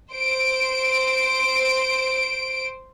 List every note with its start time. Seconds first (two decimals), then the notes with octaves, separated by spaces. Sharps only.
0.12 C5 D7